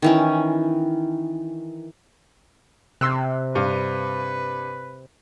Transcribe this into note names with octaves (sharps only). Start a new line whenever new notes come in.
D#3 E3 C#4
C3 C6 E6 F#6
G2 B4 F5